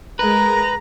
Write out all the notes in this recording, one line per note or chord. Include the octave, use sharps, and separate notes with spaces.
G#3 A#4 B4 A#5